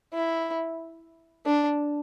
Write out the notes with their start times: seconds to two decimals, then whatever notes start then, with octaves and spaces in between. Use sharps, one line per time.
0.14 E4
1.46 D4